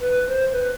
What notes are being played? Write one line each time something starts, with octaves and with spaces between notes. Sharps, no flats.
B4
C5
B4